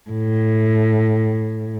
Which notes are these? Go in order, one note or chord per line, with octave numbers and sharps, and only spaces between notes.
A2